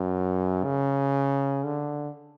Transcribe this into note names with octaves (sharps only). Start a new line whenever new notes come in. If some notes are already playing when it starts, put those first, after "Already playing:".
Already playing: F#2
C#3
D3